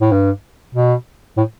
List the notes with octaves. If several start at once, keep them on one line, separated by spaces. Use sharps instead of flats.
A2
G2
B2
A2